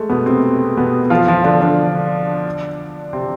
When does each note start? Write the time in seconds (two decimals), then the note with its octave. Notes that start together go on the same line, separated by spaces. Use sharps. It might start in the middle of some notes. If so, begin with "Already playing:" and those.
Already playing: G#3 A3
0.09 B2 B3
0.26 C3 C4
0.77 B2 B3
1.10 F3 F4
1.28 F3 F4
1.44 D3 D4
1.61 D3 D4
3.13 C3 C4